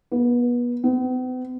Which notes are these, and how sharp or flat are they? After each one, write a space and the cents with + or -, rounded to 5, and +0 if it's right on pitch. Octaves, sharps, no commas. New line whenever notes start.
B3 -30
B3 +45